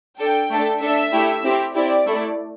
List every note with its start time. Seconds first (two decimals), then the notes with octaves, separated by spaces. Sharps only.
0.19 D4 A4 G5
0.50 A3 D4 A4
0.81 D4 A4 E5
1.12 A3 E4 G4
1.43 C4 E4 G4
1.74 C4 E4 G4 D5
2.06 A3 E4 A4